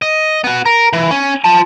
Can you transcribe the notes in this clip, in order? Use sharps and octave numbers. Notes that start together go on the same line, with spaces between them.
D#5
B3 F#4
A#4
E3
C#4
F4 A5